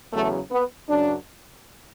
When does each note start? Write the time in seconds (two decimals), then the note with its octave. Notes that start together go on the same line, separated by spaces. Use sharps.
0.13 E2 C#3 F#3 A3
0.51 B3
0.89 F#2 C#3 F#3 D4